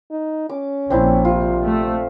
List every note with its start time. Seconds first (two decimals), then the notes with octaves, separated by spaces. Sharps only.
0.11 D#4
0.49 C#4 D6
0.90 A#1 C4 D4 E4
1.25 C3 F4
1.65 A3